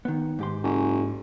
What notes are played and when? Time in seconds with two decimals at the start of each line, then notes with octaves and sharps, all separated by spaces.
0.05 D#3 B3
0.39 G#2 G4 C6
0.63 F#1